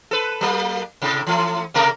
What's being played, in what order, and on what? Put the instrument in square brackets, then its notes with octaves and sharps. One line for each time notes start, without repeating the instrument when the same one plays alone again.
[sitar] A4 B4
F#3 A#3
A2 C3
E3 A3
C3 A3 A#4